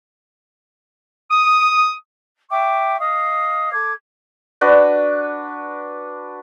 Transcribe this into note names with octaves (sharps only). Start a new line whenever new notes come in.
D#6
E5 G5 C#6 D6
D#5 F5 D#6
A4 D6 G#6
D4 F#4 B4